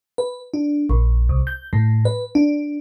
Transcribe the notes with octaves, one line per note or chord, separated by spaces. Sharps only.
B4
D4
A#1
C2
G6
A2
B4
D4